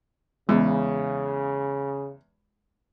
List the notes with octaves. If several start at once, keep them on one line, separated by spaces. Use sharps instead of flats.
E2 C#3 G#3